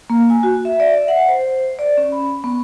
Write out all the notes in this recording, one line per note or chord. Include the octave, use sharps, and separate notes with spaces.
A#3
G#5
F#4
E5
D5
E5
F#5
C5
D5
C#4
B5
B3